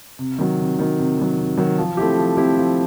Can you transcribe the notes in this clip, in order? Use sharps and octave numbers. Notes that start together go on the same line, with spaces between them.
C3
D#3 F#3
C3
D#3 F#3
C3
D#3 F#3
C3
D#3 F#3
F3
A3 C4 E4 G4
F3
A3 C4 E4 G4
F3